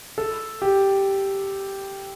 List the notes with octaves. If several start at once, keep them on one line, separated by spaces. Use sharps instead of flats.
A4
G4